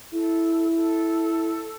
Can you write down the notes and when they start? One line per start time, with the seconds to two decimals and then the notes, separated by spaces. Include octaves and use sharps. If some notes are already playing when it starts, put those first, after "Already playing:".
0.13 E4 A4
0.75 A4